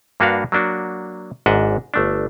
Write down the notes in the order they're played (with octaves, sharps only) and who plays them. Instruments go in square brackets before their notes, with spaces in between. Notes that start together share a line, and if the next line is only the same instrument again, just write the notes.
[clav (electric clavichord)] G2 A#3 D4 F#4 B4 F5
F#3 A#3 D4 F#4
G#1 G#2 D4 D#5 E5 F#5
G1 A3 D4